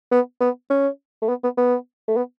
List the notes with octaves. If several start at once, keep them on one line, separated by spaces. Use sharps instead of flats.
B3
B3
C#4
A3
B3
B3
B3
A3
B3